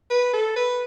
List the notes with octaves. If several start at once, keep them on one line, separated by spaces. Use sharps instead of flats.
B4
A4
B4